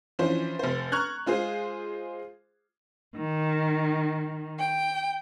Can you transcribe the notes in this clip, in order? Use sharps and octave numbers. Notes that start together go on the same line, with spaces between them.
E3 F3 C#4 D4 C5
F1 C5
A#5 C#6 F6 F#6 G#6
G#3 F4 G#4 C5
D#3
G5